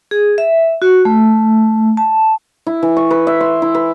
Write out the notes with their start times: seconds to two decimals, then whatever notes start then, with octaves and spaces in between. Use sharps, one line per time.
0.11 G#4
0.38 E5
0.82 F#4
1.05 A3
1.97 A5
2.67 E4
2.83 E3
2.97 C#6
3.10 B4
3.27 E5
3.40 C6
3.62 E4
3.75 B4